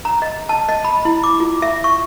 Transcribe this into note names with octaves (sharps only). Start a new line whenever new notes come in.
A#5
D#5
A5
D#5
B5
E4
D6
F4
E5
C#6